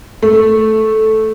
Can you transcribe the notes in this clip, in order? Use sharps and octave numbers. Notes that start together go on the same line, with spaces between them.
A3